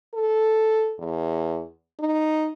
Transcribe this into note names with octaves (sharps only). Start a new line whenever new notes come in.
A4
E2
D#4